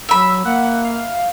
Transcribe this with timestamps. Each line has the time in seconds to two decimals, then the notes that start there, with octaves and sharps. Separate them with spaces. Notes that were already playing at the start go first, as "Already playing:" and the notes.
0.09 F#3 E5 B5 E6
0.45 A#3 F#5
0.84 F5